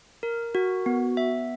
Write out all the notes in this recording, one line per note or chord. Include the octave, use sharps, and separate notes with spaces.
A#4
F#4
B3
E5